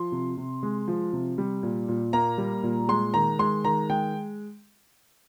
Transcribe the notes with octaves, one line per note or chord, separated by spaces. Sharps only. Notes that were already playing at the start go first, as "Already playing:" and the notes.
Already playing: F3 C6
C3
C3
G#3
F3
C3
G3
A#2
A#2
A#3 A#5
G3
A#2
G#3 C6
D#3 A#5
G#3 C6
D#3 A#5
G#3 G5